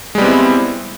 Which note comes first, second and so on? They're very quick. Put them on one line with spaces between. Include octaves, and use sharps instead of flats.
G#3 G3 B3 C4 E4